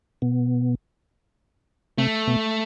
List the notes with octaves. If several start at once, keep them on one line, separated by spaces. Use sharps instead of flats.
B2 B3
C3 A3 C4
B2 B3